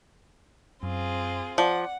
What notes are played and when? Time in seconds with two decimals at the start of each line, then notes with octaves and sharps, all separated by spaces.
0.83 F#2 C4 F4 G#4
1.58 F3 D5 F#5